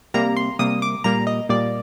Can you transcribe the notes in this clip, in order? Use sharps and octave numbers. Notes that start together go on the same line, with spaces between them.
C3 G3 A#3 A#5
C6
C3 G3 A#3 D#6
D6
A#2 G3 A#3 A#5
D#5
A#2 G3 A#3 D5